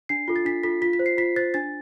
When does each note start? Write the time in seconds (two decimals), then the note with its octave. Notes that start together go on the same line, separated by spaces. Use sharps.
0.09 D4 C7
0.28 F4 A4
0.36 A6
0.45 D4 B6
0.63 F4 A4 B6
0.82 F4 B6
0.93 B6
0.99 C5
1.06 C7
1.18 F4 B6
1.36 C5 A6
1.54 D4 A6